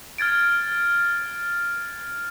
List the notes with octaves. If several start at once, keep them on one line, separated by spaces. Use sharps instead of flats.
F6 G#6 A6 D7